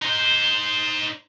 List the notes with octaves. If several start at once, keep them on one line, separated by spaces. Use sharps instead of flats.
D#4 C5